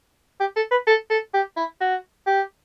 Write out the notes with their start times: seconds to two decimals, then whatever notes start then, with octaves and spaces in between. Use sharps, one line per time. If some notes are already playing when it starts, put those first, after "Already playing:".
0.40 G4
0.56 A4
0.71 B4
0.87 A4
1.10 A4
1.34 G4
1.57 E4
1.81 F#4
2.27 G4